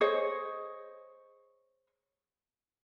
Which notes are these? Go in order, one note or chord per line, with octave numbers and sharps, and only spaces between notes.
G#4 C5 C#5 D#5